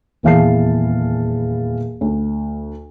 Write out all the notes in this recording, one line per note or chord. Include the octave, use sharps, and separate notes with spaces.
D#1 E2 E3 F5 A5 C7
D2